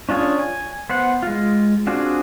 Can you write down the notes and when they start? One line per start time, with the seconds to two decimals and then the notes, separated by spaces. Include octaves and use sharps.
0.09 C#4 D4 F4 G#4 C#5
0.39 G#5
0.90 B3 C5 F#5
1.23 G#3 F4
1.87 C4 D4 F4 F#4 G#4